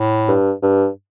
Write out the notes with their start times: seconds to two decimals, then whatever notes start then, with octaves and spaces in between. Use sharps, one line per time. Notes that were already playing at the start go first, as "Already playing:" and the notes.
Already playing: A2
0.28 G2
0.63 G2